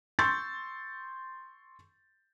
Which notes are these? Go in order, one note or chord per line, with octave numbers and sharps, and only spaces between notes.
C6 C#6 E6 G6 A6